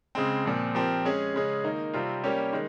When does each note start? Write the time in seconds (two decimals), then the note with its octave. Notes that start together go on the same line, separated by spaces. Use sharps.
0.15 C#3 G#3 C4
0.45 A#2 F3 C4
0.75 F3 C4 G4 A#4
1.05 G#3 C#4 G#4
1.34 C#3 G#3 C#4 G#4
1.64 D#3 A#3 D#4
1.94 C3 G3 C4 F4
2.24 G3 A#3 C#4 G4
2.53 D#3 G#3